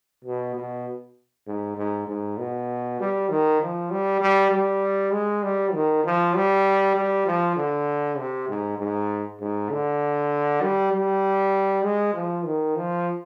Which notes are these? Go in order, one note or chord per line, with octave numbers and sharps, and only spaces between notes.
B2
B2
G#2
G#2
G#2
B2
G3
D#3
F3
G3
G3
G3
G#3
G3
D#3
F3
G3
G3
F3
D3
C3
G#2
G#2
G#2
D3
G3
G3
G#3
F3
D#3
F3